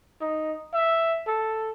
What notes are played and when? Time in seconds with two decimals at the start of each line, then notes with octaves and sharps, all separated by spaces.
0.21 D#4
0.74 E5
1.27 A4